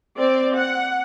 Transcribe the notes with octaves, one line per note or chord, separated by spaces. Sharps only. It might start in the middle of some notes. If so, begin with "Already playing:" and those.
C4 D5
F#5